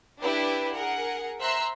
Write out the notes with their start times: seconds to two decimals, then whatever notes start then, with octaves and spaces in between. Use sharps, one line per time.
0.21 D4 E4 G4 B4 G5
0.72 G#4 A#4 F#5
1.40 C5 E5 A#5 C6 E6 F#6